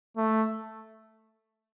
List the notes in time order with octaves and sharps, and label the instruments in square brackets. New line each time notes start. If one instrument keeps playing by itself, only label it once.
[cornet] A3